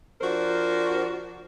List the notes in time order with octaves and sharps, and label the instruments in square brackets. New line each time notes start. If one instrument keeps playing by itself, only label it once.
[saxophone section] F3 D4 F#4 A#4 C5